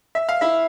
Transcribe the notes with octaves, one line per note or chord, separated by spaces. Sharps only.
E5
F5
E4 E5